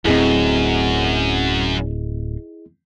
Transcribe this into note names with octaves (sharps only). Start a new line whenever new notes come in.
D1 F#2 A2 C4 E4 G#4 D#5